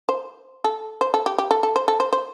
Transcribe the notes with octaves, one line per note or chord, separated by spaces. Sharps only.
C5
A4
C5
A4
G4
G4
A4
A4
C5
A4
C5
C5